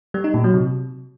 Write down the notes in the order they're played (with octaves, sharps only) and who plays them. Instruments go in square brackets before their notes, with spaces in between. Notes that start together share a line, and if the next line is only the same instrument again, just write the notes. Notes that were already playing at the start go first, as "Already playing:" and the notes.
[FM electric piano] G3
D#4
A#2
F#3
C3